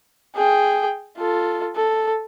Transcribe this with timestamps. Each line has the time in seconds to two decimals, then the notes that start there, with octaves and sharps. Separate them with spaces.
0.35 G#4 G5
1.17 F4 A4
1.76 A4